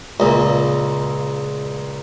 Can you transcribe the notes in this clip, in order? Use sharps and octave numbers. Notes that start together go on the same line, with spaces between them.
C#2 A#2